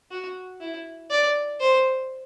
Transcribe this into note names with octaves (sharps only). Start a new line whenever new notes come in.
F#4
E4
D5
C5